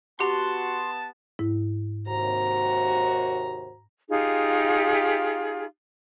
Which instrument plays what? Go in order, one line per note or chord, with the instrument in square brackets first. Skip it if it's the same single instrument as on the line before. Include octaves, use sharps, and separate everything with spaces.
[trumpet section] B3 A5 [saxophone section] F#4 [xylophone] G4 F7 [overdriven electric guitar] C6
[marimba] G#2 E4
[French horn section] D#2 C3 C5 [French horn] F#4 [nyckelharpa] A#5
[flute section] D#4 F4 G4 G#4